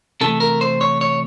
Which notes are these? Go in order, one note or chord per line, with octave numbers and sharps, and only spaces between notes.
C3 E3 A3 A4
A#4
C5
C#5
C#5